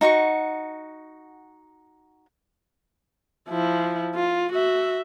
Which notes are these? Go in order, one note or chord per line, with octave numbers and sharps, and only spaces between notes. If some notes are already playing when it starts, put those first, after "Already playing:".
D#4 F#4 F#5 C#6
F3 E4
F4
F#4 E5